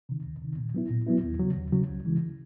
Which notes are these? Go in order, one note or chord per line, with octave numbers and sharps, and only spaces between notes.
C3 D#3
D2
C3 D#3
A#2
F#3 B3 E4
A#2
F#3 B3 E4
D#2
C#3 F#3
D#2
C#3 F#3
C#2
C#3 E3 G#3